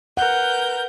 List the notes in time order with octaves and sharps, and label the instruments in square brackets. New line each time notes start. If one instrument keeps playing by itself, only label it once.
[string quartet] A#4 B4 G6 [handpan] F#5